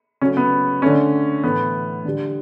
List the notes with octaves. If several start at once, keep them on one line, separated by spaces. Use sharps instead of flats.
C#3 F#3 A3 C#4
B3
D3 A3 C#4
A2 E3 A3 B3
D3 G3